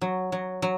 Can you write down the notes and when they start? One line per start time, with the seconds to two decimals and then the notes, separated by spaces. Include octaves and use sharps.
0.01 F#3
0.32 F#3
0.62 F#3